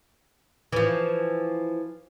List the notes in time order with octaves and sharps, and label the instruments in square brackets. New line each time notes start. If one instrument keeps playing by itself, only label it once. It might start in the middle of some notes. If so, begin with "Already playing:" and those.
[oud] E3 F3